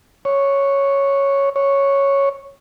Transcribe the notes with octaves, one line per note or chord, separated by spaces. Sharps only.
C#5
C#5